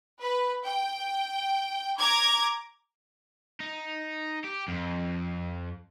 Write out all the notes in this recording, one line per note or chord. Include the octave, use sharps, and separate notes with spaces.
B4
G5
A#5 D6 G#6
D#4
G4
F2